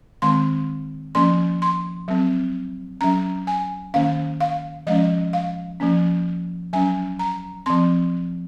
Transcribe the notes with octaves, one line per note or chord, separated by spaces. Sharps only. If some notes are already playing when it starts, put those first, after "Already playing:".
D#3 G#3 C4 C6
F3 A#3 C#4 C6
C6
F#3 C4
F#3 C#4 A#5
G#5
D#3 A#3 C#4 F5
F5
F3 G#3 C#4 D#5
F5
F3 A#3 C#4
F#3 C#4 G#5
A#5
F3 C4 C6